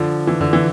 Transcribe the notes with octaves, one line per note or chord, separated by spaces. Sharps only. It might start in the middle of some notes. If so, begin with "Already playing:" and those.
Already playing: D3 F3
E3
D3
E3